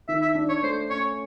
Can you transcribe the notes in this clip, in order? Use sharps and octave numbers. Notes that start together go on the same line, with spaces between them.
D#3 E5
E5
D4
C#5
A3 C5
C#4 C#5